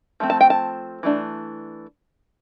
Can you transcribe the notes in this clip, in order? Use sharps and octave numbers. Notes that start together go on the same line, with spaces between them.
F3 A3 C4
A5
G5
A5
E3 A3 D4